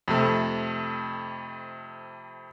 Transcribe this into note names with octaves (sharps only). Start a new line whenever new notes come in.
F2 C3 A3